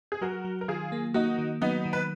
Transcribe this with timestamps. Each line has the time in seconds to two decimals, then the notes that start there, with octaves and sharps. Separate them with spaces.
0.12 G#4
0.21 F#3 F#4 A#4
0.45 F#3
0.61 A#4
0.68 D#3 F4 G#4
0.92 A#3
1.14 A#3 D#4 F#4
1.39 D#3
1.61 F#3 B3 D#4
1.86 D#3
1.93 B4